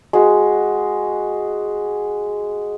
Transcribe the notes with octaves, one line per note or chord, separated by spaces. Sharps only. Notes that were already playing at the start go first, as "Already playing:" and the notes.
G#3 F#4